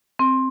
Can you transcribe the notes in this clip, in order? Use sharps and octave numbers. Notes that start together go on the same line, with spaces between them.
C4